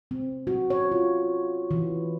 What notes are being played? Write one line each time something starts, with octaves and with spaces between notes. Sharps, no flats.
C4
F#4
C#5
F4
E3